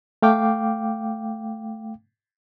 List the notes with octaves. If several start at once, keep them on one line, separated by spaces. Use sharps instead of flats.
A3 F5 G5 D6